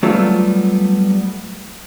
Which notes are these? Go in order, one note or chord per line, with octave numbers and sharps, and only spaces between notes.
F#3 G3 A3 B3 F4